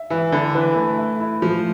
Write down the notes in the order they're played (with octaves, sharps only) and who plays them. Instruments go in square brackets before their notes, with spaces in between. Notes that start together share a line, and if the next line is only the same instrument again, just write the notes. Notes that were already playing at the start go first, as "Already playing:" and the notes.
Already playing: [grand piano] E5
[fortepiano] E3 [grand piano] E5
[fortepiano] D3 [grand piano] E4
[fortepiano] E3 [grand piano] B4
[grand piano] A3
E5
E4
[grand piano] A2 [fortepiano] F3